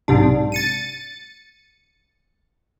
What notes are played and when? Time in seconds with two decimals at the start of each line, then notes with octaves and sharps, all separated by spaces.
0.08 B1 G#2 C3 D4
0.52 A6 C#7 D#7